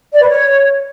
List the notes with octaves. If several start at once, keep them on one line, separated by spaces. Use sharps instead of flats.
D5
B4
C#5